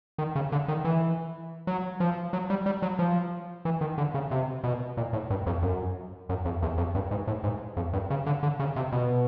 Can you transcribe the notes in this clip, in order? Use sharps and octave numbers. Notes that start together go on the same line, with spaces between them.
D#3
C#3
D3
D#3
E3
F#3
F3
F#3
G3
G3
F#3
F3
E3
D#3
D3
C#3
C3
B2
A#2
A2
G2
F2
F#2
F#2
F2
E2
F2
G2
G#2
A2
G#2
F2
G2
C#3
D3
D3
C#3
C3
B2